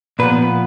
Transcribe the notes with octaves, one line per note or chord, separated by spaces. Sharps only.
A#2 F3 B3 B4